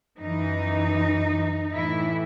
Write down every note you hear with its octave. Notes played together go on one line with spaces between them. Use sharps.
F#2 E3 D#4
A2 E3 E4